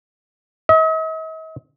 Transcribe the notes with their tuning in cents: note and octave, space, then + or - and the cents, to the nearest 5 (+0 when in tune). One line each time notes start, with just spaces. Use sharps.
D#5 +45